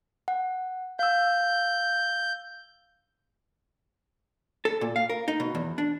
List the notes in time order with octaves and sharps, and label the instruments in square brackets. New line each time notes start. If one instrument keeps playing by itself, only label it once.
[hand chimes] F#5
[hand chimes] F5 E6 [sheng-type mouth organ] G6
[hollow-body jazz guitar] A4
A#2
F5
A#4
D#4
B2
E2
D4